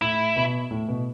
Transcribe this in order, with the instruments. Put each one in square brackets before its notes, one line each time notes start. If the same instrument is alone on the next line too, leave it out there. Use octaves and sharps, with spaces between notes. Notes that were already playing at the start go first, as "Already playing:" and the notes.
[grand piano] A2 [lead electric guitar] E4
[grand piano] B2
A2
B2